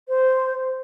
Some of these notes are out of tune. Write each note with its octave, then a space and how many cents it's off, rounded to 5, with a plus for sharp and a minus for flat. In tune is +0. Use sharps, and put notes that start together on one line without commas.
C5 -10